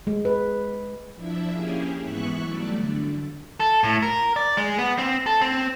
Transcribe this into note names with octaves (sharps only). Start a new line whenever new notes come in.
G#3
B4
F3 D4 E4 E5
A#3 C#4 E4 G4 G#4
G#2 E3 B3 E5 C#6 F#6
F#3 G3 A3 D5
D3
A4
A2
A#4
D5
G#3
B3
C4
A4
C4